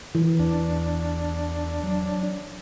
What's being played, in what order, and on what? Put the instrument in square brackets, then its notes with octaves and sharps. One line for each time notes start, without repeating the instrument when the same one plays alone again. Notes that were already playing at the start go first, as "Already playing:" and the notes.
[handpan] E3
[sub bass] E2 [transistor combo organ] D4
[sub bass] F#3